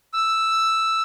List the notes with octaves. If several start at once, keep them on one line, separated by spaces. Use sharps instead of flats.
E6